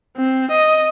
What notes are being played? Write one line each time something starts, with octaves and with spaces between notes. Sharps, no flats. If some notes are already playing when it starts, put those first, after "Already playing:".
C4
D#5